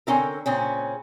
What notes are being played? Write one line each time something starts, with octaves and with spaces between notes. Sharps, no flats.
D3 C4 C#4 E4 A#4
A#2 C#3 C4 C#4